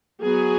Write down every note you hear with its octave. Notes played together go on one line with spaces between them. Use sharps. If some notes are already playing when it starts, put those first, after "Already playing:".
F#3 B3 G#4